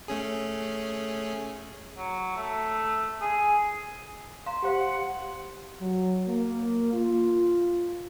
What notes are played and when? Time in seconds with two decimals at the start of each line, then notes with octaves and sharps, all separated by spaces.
0.08 A3 C#4 G#4
1.97 F#3
2.36 A3
3.21 G#4
4.46 F5 A#5 C6
4.63 G4 C5 F5 F#5
5.81 F#3
6.28 A#3
6.94 F4